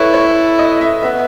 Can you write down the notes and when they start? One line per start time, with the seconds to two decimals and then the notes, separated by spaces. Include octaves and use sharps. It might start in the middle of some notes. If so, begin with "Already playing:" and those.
Already playing: E4 A4 B4 C#5
0.14 C#5
0.59 D#5
0.81 E5
1.03 B3 E5